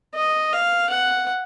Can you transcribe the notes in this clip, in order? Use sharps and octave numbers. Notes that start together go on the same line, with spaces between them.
D#5
F5
F#5